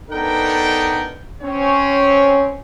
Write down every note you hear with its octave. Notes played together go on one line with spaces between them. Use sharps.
B3 D4 D#4 A4 A#4 G5
C4 C#4 C#5